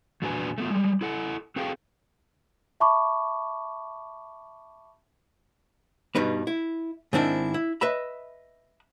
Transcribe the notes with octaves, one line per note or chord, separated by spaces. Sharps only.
E2 A#2 D4 F#4 B4 G#5
A3 B3 F4
G3 G#3
E4 A4 F#5
C4 F#4 G#4 A4 F5 G5
E5 A5 B5 C#6 D6
G2 B2 G3 D#4 B4
E4
G#2 D#3 C4 D4 E4
E4
B4 D#5 E5 B5